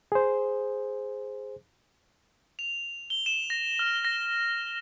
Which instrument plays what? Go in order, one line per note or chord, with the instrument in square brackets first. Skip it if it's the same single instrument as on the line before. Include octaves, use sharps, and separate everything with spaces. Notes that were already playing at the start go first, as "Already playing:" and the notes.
[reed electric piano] G#4 C5
[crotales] F7
G7
E7
A#6
F6
A#6